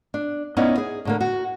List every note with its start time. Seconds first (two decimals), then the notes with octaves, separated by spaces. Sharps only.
0.14 D4
0.57 B3 C#4 D#4 E4 D5 F5
0.78 G#4
1.05 A2 D3 A#3
1.21 F#4